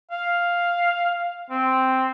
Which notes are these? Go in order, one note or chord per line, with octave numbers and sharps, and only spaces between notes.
F5
C4